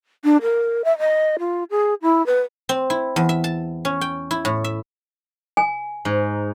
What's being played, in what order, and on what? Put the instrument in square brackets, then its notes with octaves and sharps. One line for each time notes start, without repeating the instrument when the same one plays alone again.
[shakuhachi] D4
A#4
E5
D#5
F4
G#4
E4
B4
[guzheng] C4
E4
E2
E5
A5
C#4
G5
E4
A2
E5
[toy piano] G#5
[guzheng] G#2